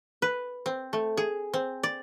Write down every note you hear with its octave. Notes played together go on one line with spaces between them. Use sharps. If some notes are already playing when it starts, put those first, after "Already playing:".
B4
C4
A3
G#4
C4
D5